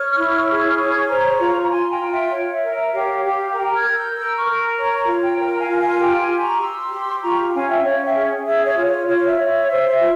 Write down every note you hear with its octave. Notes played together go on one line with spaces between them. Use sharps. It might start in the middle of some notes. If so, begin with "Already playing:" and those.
Already playing: C#5 C#6 F6
E4
G#4
C#5
C5 A#5 C#6
F4
F4 G#5 C6
G5 A#5
F4
E5 G5
C#5
E5
A#4
E5
G4 C#5 F5
G4
A#4 G5 A#5
F6 G#6
A#4
E6 G6
A#4 E6 G6
C#6 F6
A#4
C#5 A#5 C#6
A#5 C#6
F4
G5 A#5
A#4 G5 A#5
F5 G#5
F4
F5 G#5
G4 G5 A#5
G#5 C6
G4
A#5 C#6
G4 C6 E6
G4
F4 A#5 C#6
C#4 F5 G#5
E5 G5
C#4 C#5 F5
E5 G5
G#4
G#4 E5
C#5
F4
C#5
F4 C#5
E5
C#5
E5
C5 E5
E5
F4